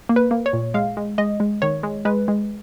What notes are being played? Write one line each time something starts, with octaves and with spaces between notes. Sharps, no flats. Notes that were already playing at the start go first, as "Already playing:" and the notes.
A#3
B4
A#3
C#5
A#2
G#3 F5
G#3
G#3 D#5
G#3
D#3 C#5
G#3
G#3 B4
G#3